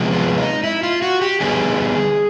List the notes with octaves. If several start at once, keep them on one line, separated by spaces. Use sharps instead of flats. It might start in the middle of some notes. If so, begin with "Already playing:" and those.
Already playing: C3 F3 G#3 B3
F4
D#4
E4
F4
F#4
G4
D3 G3 B3 D#4 G#4